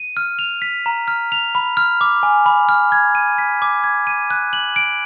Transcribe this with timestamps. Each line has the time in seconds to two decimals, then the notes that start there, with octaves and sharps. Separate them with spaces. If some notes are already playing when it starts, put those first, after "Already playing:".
Already playing: D#7
0.17 F6
0.39 F7
0.62 B6
0.86 A#5
1.08 F6
1.32 F7
1.55 B5
1.77 F6
2.01 D6
2.23 G#5
2.46 B5
2.69 F6
2.92 G#6
3.15 D#7
3.38 B6
3.62 D6
3.84 G#6
4.07 D#7
4.31 F#6
4.53 F#7
4.76 D7